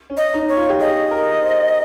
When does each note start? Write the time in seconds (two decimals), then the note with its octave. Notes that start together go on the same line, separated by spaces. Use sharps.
0.10 C#4
0.17 D#5
0.34 D#4
0.49 C#5
0.57 F4
0.70 G4
0.79 G#4 D#5
1.11 A#4
1.42 C5